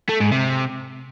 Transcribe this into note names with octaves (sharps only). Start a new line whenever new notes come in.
A3
G#2
C3